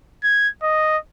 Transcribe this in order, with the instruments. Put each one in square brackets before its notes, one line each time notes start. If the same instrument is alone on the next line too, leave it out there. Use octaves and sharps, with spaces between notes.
[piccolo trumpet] G#6
D#5